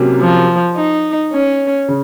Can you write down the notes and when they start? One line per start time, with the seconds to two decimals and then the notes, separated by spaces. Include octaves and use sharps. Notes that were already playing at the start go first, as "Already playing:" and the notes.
Already playing: C3 F#3 A#3 C#4 F#4
0.21 F3
0.76 D#4
1.33 C#4
1.88 C#3